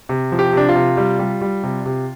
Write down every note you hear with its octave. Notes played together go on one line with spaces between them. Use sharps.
C3
F3
G4
C3 D4
F4
C3
G3
G3
G3
C3
C3